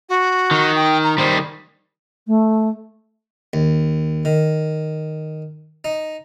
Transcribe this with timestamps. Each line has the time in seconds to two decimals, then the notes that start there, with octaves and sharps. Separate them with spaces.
0.09 F#4
0.51 D#3
0.75 G5
1.03 A#5
1.18 D#3 G3 C5
2.27 A3
3.53 D#2
4.25 D#3
5.84 D#4